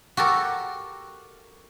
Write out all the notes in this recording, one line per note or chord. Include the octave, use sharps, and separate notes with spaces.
F#4 G4 A4 A#4